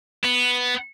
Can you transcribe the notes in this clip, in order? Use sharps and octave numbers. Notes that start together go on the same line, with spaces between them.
B3